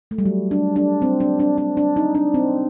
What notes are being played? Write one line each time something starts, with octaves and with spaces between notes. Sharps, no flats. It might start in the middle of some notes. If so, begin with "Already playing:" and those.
A3
G3
F#3
D4
D4
C4
D4
D4
D4
D4
D#4
D4
C4